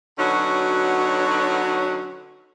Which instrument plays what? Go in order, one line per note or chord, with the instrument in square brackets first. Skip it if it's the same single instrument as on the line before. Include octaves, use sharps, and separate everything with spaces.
[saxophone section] B2 D3 F#3 C#4 D#4 F#4